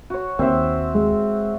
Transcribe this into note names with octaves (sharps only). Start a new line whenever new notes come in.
F#4 C#5
D#2 C4 E5
G#3